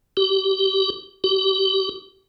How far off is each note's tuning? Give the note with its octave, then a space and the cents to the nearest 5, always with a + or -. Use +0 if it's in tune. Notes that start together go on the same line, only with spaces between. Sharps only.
G4 -30
G4 -35